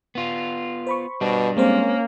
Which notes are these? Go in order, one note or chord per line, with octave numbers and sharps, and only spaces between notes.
B3 F4
C5 B5 C#6
B2 G3 D4
G#3 A#3 C4 C#4 C5